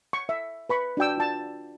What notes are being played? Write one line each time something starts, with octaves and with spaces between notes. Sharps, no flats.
C#6
E5
B4 B5 C#6
D4 F#4 G5 E6
F4 A5